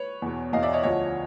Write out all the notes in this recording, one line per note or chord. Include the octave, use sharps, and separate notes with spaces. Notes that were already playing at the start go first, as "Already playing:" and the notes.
Already playing: B4 C#5
E2 B2
E2 B2 D#5 F5
D5 E5
C#5 D#5
D2 D3 F3 C#5 D#5